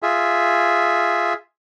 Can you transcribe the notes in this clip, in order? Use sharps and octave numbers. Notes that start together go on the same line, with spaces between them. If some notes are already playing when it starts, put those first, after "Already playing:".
F4 G#4 E5